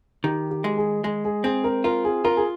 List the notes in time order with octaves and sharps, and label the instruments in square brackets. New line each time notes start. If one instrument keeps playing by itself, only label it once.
[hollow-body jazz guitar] D#3 [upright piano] G4
[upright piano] G4
[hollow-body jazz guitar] G#3
[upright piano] G#4
[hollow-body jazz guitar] G#3 [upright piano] G#4
[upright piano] G#4
[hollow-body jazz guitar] C4 [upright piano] G#4
[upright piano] A#4
[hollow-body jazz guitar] F4 [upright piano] A#4
[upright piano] G#4
[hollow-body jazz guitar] F4 [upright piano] A#4
[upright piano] G#4